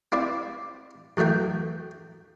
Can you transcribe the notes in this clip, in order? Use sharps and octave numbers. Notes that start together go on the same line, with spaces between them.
C4 E4 D5 E5
F#2 E3 A3 E5 G5